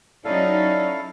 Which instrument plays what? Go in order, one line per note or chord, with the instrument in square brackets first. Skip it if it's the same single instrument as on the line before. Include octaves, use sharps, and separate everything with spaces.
[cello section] F#3 C#4 D#4 [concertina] E4 A4 F5 [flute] D5